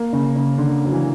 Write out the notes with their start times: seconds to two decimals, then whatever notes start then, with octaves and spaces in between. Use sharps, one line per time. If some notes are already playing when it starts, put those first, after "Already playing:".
Already playing: A#3
0.13 C#3
0.36 C#3
0.58 D3
0.85 F#3
0.92 E3